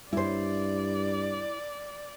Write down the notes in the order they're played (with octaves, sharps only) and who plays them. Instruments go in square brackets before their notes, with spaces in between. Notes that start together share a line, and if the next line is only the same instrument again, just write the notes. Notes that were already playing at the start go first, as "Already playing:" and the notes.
[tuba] G2 [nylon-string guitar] E4 C5 [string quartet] D5